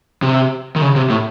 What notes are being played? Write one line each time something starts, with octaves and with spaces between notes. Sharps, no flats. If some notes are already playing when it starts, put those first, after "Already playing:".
C3
D#3
C#3
C3
A2